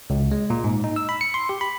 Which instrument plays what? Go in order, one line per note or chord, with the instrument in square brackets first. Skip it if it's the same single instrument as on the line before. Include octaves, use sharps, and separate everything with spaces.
[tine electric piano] C#2
G#3
A#2
G#2
D#4
E6
B5
C#7
C6
G4
B5